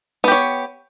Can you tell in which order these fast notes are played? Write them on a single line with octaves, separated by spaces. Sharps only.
B3 G4 C#5